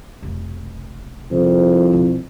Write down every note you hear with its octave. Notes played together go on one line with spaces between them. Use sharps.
F1 B1
C2 F2 C3
B1